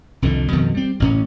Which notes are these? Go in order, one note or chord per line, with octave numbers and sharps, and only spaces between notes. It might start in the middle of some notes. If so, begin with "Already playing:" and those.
C2 F2 D3 D#3
F2 B2 D#3
G3 C4
A1 A2 C#4